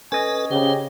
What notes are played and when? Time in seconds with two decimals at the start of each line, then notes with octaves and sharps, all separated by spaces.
0.12 C#4 A4 B4 D#5 G#5
0.51 C#3 G4 C5